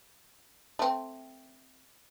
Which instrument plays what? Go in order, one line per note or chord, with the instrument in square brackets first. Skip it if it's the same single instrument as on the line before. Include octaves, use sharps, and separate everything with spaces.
[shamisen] A3 C4